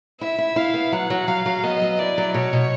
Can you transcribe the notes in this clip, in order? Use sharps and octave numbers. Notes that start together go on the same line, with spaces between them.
E4 E5
E4
E4 F5
B3
F#3 F#5
F#3
F#3 F5
F#3
B3 D#5
F#3
E4 D5
F#3
B2 C#5
B2